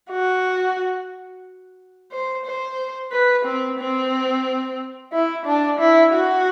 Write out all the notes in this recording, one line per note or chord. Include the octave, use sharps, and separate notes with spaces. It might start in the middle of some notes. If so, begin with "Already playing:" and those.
F#4
C5
C5
B4
C4
C4
E4
D4
E4
F#4